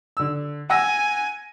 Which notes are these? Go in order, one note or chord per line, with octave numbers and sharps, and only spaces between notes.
D3 E6
F#5 G#5 E6 A#6